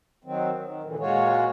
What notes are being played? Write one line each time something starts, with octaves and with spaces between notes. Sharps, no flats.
D#3 F#3 C4
D#3
D#2 A#2 D3 E3
A#2 G#3 F4 F#4 C#5